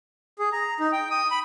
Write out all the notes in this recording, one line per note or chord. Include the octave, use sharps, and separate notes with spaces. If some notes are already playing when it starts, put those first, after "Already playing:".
G#4
A#5
D#4
G5
D#6
B5